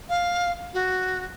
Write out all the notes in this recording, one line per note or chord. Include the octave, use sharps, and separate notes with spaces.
F5
F#4